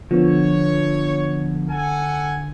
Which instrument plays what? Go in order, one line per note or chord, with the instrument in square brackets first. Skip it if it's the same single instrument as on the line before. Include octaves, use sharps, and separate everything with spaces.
[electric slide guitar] D3 [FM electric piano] F3 B3 [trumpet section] C#5
[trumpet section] A4 F#5 G#5